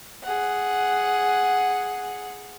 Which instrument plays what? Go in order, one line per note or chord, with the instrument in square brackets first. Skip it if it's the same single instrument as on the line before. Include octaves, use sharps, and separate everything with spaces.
[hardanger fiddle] G#4 F#5